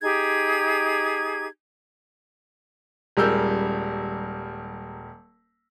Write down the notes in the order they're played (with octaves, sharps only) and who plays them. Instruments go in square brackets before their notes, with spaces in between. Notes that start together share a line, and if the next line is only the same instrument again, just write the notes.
[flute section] D#4 G4 G#4 G#6
[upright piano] D#1 G3 G#3 A#4 E6 G6